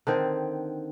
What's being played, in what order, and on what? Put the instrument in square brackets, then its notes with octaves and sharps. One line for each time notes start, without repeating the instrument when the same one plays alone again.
[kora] D3 D#3 C4 C5